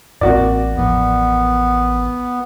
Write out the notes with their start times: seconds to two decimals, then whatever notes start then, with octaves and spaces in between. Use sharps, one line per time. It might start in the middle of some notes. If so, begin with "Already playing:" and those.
0.21 A1 A2 A#3 C4 F#4 D5
0.76 D#2 A2 F3 B3